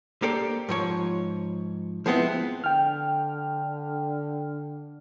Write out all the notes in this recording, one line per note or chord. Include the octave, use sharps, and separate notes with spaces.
A#3 G4 A4 C5 D5
G#2 F3 C#5
F3 G#3 B3 C4 E4
D3 G5 F6